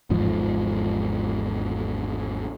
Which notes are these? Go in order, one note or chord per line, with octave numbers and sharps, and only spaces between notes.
G#1 E2 G#2 F3